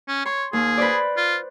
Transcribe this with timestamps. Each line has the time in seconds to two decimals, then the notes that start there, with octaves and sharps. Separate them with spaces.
0.08 C#4
0.26 C#5 C6
0.53 D#2 G#4
0.78 B4 C5 D5
1.17 F4